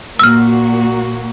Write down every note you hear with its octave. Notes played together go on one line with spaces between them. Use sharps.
A#2 A#3 F#4 E6 F6